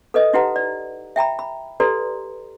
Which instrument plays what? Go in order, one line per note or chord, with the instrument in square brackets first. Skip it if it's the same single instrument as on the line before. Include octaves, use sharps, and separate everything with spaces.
[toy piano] A4 B4 D#5 D#6
D#4 E4 G4 B4 F#5 A#5
D5
E5 G5 A#5 B5
B5
G4 A4 B4 D5 A#5 C6